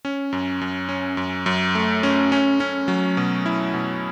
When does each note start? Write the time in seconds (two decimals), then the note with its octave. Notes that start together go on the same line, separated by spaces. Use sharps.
0.05 C#4
0.33 F#2
0.61 F#2
0.89 C#4
1.17 F#2
1.46 F#2
1.75 A3
2.03 C#4
2.32 C#4
2.60 C#4
2.88 F#3
3.17 B2
3.46 E4
3.74 B2